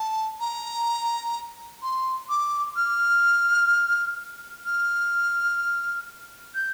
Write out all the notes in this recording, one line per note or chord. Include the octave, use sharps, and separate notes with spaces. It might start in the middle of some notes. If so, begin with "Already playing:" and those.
Already playing: A5
A#5
C6
D6
F6
F6
G6